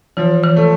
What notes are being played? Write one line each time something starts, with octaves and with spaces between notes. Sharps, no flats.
E3 F3
E3
A3